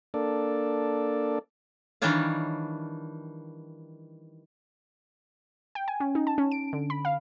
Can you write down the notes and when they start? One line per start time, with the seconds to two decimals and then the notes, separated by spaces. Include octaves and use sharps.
0.14 A#3 D4 A4 D5
2.02 D#3 E3 G3 D4 C#5 F5
5.75 G5
5.88 G#5
6.00 C#4
6.15 D#4
6.27 A5
6.38 C#4
6.52 D7
6.73 D3
6.90 B5
7.05 F5